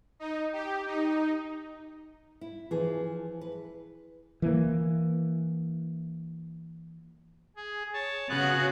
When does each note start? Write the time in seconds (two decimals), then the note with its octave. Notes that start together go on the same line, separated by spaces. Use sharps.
0.20 D#4
0.53 G4
0.87 D#4
2.41 E4
2.71 E3 F3 G#4
3.41 B4
4.42 E3 A#3
7.57 G#4
7.94 C#5 A5
8.29 C#3 B3 F#4 G#4 F#6